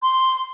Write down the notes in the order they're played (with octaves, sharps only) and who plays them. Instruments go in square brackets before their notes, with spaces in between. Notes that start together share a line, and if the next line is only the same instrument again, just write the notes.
[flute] C6